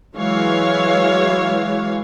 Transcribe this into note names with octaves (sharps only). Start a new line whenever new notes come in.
E3 F#3 G#3 C#5 F5